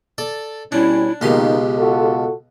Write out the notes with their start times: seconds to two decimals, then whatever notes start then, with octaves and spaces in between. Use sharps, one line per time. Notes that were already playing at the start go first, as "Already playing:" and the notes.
0.18 A4 D5
0.72 B2 G3 C#4 D4 E4
1.21 C#2 B2 D#3 A#3 G4 C6
1.78 F4 F#4 A4